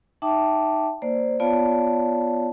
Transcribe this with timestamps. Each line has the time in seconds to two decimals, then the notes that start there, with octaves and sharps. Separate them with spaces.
0.22 D#4 E5 G5 A5 D6
1.02 A#3 C5 D5
1.40 B3 F4 C#5 D5 F5 A5